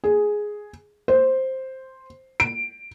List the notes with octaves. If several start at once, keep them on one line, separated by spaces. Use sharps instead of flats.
G#4
C5
D7